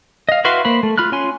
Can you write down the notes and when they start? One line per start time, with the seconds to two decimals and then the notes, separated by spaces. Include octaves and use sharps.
0.29 D#5 F5
0.44 E4 F#4 B4 F5 C6
0.65 A#3 C5 B5
0.83 A3
0.98 F4 B5 F6 F#6
1.12 C#4 F4 G#5 C6